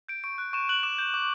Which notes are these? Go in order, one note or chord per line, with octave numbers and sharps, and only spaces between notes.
G6 D7
C#6 D7
F#6
C#6 E7
F#6 F#7
D6 E7
G6
D6